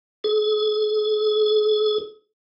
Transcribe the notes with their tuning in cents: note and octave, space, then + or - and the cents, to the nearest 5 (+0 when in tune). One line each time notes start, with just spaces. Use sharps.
G#4 +45